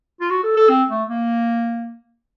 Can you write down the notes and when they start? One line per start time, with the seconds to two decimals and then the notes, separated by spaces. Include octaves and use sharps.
0.21 F4
0.30 F#4
0.43 A4
0.57 A4
0.69 C4
0.90 A3
1.08 A#3